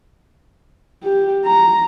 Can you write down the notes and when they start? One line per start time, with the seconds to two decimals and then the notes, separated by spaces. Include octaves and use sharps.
1.04 G4
1.45 A#5